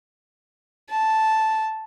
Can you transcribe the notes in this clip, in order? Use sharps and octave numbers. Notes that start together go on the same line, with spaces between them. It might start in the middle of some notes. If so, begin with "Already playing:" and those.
A5